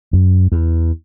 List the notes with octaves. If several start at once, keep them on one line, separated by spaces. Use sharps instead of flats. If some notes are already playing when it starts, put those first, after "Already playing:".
F#2
E2